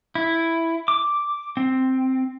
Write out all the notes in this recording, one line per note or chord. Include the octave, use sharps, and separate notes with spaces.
E4
D6
C4